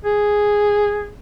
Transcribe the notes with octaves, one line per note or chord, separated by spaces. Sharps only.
G#4